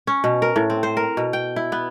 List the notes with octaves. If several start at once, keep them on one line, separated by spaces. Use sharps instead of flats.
C#4
B2
A#4
A2
C4
C5
A#4
B2
G5
E4
B3